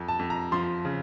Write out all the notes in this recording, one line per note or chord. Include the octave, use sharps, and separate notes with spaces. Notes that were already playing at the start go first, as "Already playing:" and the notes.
Already playing: F2
A5
F2
A#5
F3 C6
C#3